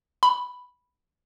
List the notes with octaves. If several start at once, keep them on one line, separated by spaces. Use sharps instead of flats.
B5